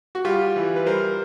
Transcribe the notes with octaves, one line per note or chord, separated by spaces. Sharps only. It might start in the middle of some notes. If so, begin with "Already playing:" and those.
F#4
G3 F4 G4
E3
B4
G3 A#4 C5